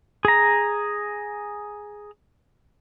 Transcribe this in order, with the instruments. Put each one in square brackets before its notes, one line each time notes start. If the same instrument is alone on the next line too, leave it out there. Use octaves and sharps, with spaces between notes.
[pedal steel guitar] G#4 A#5